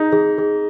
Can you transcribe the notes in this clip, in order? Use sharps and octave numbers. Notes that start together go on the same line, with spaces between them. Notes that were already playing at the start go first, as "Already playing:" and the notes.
Already playing: D#4 G#4 D#5
G#4
G#4